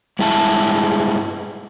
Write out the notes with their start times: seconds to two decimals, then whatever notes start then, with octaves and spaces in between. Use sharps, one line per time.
0.19 G2 G#3 E4 G#4 A5